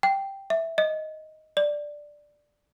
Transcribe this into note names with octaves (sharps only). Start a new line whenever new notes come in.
G5
E5
D#5
D5